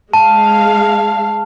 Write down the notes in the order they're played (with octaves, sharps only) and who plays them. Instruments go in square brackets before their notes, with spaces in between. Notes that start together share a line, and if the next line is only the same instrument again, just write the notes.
[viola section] G#3 F5 [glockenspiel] A5